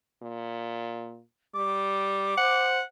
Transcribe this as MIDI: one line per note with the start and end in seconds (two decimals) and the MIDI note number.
0.22 1.20 46
1.55 2.36 55
1.55 2.65 86
2.38 2.81 72
2.38 2.82 78